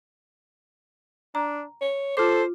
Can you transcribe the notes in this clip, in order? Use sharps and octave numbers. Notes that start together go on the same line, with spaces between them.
D4 A#5
C#5
F4 A4 C5 D6